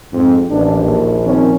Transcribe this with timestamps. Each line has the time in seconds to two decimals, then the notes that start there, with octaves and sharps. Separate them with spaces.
0.13 F2 G#2 C4
0.50 A1 D#2 D4
0.80 A#1
1.26 D#3 F3 C4 C#4